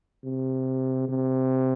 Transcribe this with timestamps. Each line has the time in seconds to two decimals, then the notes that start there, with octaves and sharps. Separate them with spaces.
0.24 C3
1.09 C3